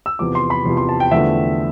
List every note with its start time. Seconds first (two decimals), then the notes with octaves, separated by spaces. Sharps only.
0.06 E6
0.19 E2 C3 F3 D6
0.35 C6
0.50 B5
0.66 E2 C3 F3
0.77 C6
0.89 A5
1.00 G5
1.11 E2 D3 F3 A3 E5